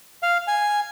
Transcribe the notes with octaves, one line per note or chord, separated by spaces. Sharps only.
F5
G#5